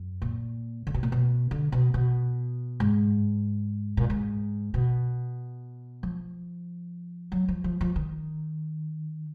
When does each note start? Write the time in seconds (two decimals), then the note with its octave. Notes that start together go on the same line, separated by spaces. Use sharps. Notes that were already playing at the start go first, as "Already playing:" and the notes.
Already playing: F#2
0.22 A#2
0.87 D3
0.94 B2
1.03 A#2
1.12 B2
1.51 D3
1.72 B2
1.94 B2
2.80 G#2
3.97 A#2
4.10 G#2
4.74 B2
6.03 F3
7.32 F#3
7.48 F3
7.64 F3
7.81 F3
7.96 D#3